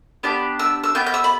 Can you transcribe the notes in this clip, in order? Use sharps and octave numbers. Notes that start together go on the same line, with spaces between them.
B3 D4 G4 G6
E6
E6
B3 G4 G6
G6
E6
B5